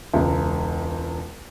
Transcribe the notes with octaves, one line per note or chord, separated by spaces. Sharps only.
E1 C#2